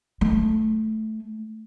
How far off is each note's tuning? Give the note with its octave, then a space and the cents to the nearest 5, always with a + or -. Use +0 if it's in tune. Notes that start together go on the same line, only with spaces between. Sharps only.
A3 -10